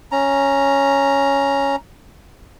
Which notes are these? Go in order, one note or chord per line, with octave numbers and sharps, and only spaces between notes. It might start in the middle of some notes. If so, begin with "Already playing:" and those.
C#4 A#5